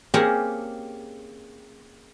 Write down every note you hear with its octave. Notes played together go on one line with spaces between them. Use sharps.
A#3 C4 C#4 G4 G#4 A#4